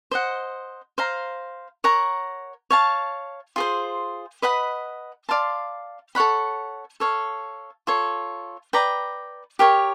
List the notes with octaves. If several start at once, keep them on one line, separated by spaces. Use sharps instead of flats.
C5 D#5 F#5
C5 F5 A#5
A#4 C#5 F#5 A#5
C#5 F5 A5
F4 G#4 C5
B4 D#5 F#5 B5
D5 F5 A5 C6
A4 C#5 F#5 B5
A4 C#5 F5
F4 A4 C#5
B4 D5 G5 A#5
G4 A#4 C#5